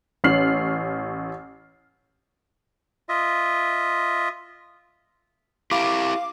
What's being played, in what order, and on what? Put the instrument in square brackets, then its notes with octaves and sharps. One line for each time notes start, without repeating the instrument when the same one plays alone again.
[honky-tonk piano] A1 C#4 F6 C7 F#7
[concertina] F4 D#5 E5
[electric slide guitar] E4 G4 [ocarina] F5 [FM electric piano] D6